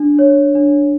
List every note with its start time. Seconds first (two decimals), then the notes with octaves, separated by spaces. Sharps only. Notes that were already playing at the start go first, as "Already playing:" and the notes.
Already playing: D4
0.19 C#5
0.55 D4